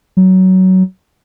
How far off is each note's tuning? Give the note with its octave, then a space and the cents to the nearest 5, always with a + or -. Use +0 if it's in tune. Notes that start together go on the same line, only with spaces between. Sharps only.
F#3 +15